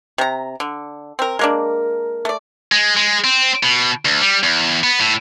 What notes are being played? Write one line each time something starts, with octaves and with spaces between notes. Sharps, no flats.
C3 A#5
D3
C4 A#4
G#3 A#3 D4 A#4
A3 D5
G#3
G#3
C4
B2
D2
G3
E2
B3
A2